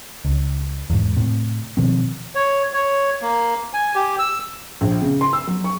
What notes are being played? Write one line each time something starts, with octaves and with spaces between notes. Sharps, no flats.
C#2
E2 G#2
A2 C3
B2 D#3 F3 C4
C#5
C#5
A#3
G#5
G4
E6
A#1
C#3
C6
E6
F#3
C#6